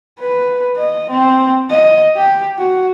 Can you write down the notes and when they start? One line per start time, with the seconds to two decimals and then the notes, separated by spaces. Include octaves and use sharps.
0.19 B4
0.76 D#5
1.10 C4
1.70 D#5
2.16 G4
2.58 F#4